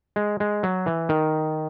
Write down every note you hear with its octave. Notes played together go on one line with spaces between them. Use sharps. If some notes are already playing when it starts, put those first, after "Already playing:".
G#3
G#3
F#3
E3
D#3